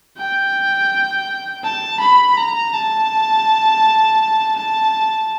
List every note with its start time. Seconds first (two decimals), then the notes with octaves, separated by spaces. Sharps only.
0.18 G5
1.64 A5
2.00 B5
2.37 A#5
2.74 A5
4.56 A5